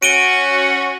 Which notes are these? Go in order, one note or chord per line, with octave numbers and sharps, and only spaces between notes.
C#4 F#4 D7 D#7 G7